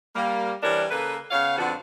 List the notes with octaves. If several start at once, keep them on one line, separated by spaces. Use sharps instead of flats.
G3 A#3
E3 G3 C4 D4 A#4 C#5
C#3 A#3 A4 B4
C#3 B3 C#5 F5
F2 D3 F3 B3 F#4 A4